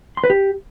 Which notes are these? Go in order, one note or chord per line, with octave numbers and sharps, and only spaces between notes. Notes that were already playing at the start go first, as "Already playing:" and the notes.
C6
B4
G4